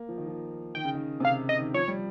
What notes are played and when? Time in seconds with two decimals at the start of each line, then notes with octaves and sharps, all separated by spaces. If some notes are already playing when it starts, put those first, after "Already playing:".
Already playing: A#3
0.09 F3
0.18 D#3
0.27 F3
0.75 D#3 G5
0.85 C#3
0.94 D#3
1.20 C3
1.25 C#3 F5
1.49 D#5
1.58 D#3
1.74 F3 C#5
1.88 G3